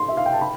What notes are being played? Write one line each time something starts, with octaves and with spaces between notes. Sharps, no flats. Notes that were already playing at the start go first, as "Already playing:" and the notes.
Already playing: C6
E5
F5
G5
A5
B5